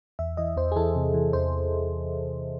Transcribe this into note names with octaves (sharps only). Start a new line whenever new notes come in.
E2 E5
E3 D#5
E2 C5
G#4
E3 A4
C3
E3
E2 C5